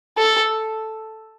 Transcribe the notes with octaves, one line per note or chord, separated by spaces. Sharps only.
A4